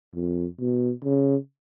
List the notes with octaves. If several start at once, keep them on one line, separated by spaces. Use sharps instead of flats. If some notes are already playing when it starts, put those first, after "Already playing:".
F2
B2
C#3